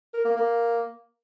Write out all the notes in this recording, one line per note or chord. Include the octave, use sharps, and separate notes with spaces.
A#4
A#3
A#3